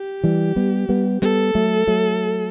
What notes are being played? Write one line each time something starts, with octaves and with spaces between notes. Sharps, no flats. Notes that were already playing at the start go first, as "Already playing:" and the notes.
Already playing: G4
E3 G3
G3 B3
G3 B3
G3 B3 A4
F#3 A3
F#3 A3